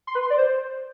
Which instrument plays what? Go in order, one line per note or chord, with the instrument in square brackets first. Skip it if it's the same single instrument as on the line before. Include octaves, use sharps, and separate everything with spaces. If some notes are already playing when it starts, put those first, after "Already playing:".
[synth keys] C6
B4
C6
D5
C5